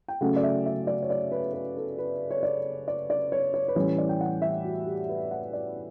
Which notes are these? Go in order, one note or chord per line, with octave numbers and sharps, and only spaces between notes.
G5
C#3 F#3 A3 C#4 F#5
D5
E5
E5
D5
C#5
D5
B4
B4
A4
B4
C#5
D5
D5
D5
C#5
C#5
B4
A2 E3 G3 C#4 C#5
D5
G5
F#5
E5
F#4
G4
B4
F#5
D5